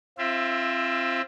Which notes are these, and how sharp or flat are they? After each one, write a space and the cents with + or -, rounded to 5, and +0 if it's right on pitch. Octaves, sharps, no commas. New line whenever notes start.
C4 +20 F4 -25 E5 +0